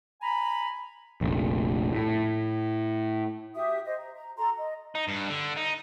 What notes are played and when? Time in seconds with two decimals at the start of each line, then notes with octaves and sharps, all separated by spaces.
0.22 G#5 A#5 B5
1.21 F1 A#1
1.93 A2
3.54 F#4 G4 E5 D#6
3.86 G4 C5 D#5
3.98 A#5
4.16 A#5
4.37 F#4 A4 A#5 C6
4.56 D#5
4.95 D#4
5.08 G2
5.29 D3
5.57 D#4